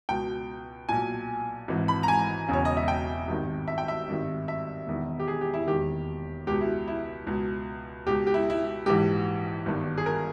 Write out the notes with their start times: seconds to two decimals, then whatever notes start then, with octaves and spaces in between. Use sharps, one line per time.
0.09 C#2 B2 G5
0.89 B1 A#2 G#5
1.68 G#1 G#2 E3
1.88 B5
2.03 A#5
2.08 G#5
2.48 E1 E2 C#3 C#5
2.65 D#5
2.77 E5
2.88 G5
3.28 G#1 G2 D#3
3.68 E5
3.78 G5
3.88 E5
4.08 G#1 G2 D#3
4.48 E5
4.87 E1 E2 D#3
5.20 G4
5.28 G#4
5.41 G4
5.54 E4
5.67 E1 D#2 D#3 G4
6.47 C#2 B2 G4
6.61 E4
6.88 E4
7.27 C#2 B2
8.06 C#2 B2 G4
8.27 G4
8.34 E4
8.50 E4
8.86 A#1 G#2 E3 G4
9.66 G1 G2 D#3
9.98 G#4
10.06 A#4